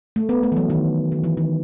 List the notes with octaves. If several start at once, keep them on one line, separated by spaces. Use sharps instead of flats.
A3
B3
A3
E3
F#3
D#3
D#3
E3
D#3